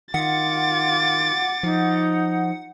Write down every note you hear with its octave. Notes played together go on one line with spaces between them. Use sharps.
D#3 F4 F#5 D6 A6
F3 D#4